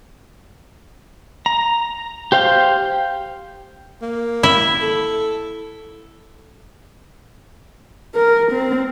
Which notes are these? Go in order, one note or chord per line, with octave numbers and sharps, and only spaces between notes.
A#5
G4 C5 F5 G5
A#3
E4
A4
A#4
C4